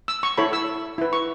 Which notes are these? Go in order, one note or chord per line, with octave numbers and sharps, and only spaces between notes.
E6
C#6
E4 A4 C#5 B5
E6
E4 B4
C#6